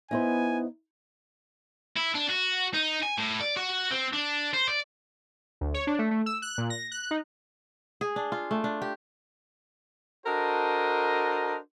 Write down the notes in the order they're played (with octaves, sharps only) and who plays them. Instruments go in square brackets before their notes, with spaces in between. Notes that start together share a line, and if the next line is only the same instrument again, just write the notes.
[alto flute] B3 [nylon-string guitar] D#4 E4 C5 [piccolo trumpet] G#5
[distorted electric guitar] E4
D4
F#4
D#4
G#5
A2
D5
F#4
C4
D4
C5
D5
[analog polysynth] D2
C#5
D4
A3
A3
E6
F#6
A#2
A#6
F#6
D#4
[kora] G#4
D4
F4
A3
D4
G4
[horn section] D4 F#4 A4 A#4 C5 D#5